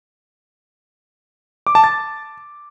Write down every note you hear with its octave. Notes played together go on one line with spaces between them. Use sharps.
D6
A5
A6